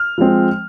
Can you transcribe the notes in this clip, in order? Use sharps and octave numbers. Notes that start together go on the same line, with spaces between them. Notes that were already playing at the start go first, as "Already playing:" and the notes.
Already playing: F6
F3 G#3 C4